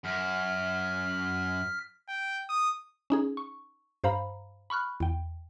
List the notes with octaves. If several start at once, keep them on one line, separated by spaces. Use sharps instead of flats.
F#2 F6 B6
G5
D#6
C#4 D#4 G#4
C#6
G2 C5 F5 A#5 B5
B5 C#6 F6 F#6
E2 G5